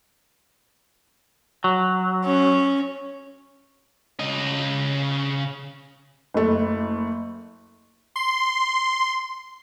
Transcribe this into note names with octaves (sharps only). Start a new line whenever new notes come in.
F#3
C#4
C#3 D#5
F#1 A3
C6